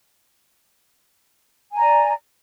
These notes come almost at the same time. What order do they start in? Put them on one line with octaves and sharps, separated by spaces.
G#5 A#5 D5